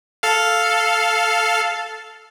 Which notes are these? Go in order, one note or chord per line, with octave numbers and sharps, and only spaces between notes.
A4 F5